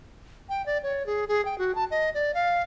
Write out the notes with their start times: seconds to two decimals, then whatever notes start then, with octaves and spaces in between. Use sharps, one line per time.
0.49 G5
0.66 D5
0.83 C#5
1.06 G#4
1.28 G#4
1.45 G5
1.58 F#4
1.75 A5
1.91 D#5
2.14 D5
2.34 F5